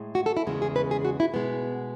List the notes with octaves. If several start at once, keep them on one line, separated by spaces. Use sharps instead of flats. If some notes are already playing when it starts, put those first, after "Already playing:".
Already playing: A2 G#3
F#4
A4
E4
E2 C#3 G#3
G#4
B4
G#4
F#4
E4
B2 G#3 B3